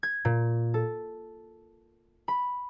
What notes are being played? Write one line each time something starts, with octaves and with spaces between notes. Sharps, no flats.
G#6
A#2
A4
B5